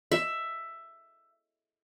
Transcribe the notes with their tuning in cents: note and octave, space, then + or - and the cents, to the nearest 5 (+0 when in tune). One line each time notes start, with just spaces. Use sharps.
E5 +10